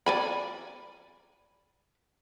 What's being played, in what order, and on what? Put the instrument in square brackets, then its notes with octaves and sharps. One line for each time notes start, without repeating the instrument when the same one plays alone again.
[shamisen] D5 G#5 B5